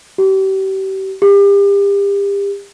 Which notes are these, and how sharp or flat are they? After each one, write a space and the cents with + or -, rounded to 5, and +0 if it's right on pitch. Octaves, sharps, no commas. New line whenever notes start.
G4 -35
G4 +35